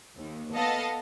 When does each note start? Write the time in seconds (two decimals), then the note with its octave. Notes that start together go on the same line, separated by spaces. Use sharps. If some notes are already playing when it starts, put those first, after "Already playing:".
0.18 D#2
0.54 B3 A4 D#5 F5 A5